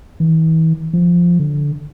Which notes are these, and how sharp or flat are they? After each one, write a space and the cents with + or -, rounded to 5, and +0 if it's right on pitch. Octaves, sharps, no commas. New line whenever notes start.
E3 -40
F3 -5
D3 -10